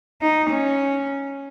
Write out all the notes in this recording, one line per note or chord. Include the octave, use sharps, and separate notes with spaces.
D#4
C#4